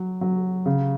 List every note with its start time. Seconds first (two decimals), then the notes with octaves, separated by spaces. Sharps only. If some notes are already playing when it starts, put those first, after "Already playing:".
Already playing: F#3
0.21 F#3
0.66 C#3